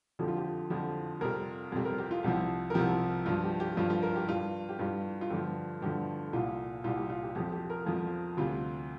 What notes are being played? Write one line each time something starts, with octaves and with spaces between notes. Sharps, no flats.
F2 D3 F3 G4
F4
G4
F2 D3 F3 G4
F2 C3 G3 A#4
F2 C3 G3
A#4
G4
F4
C2 C3 F3 G4
A#4
C2 C3 F3 G4
G2 F3 F4
G4
G4
G2 F3 F4
F4
A#4
G4
G2 G3 F4
G4
G2 G3 F4
F4
G2 D3 F3 G4
G2 D3 F3 G4
C2 A#2 G3 F4
C2 A#2 G3 F4
G4
F4
G4
F2 F3 G4
G4
A#4
F2 F3 F4
D2 C3 G3 F4